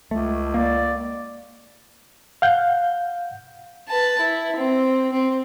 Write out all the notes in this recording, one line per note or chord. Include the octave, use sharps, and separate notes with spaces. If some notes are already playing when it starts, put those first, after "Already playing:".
C#2 A3
A#3 D5
F5 F#5 G6
B4 A5
E4
C4
C4